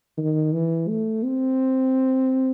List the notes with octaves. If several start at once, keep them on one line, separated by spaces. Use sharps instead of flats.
D#3
E3
A3
C4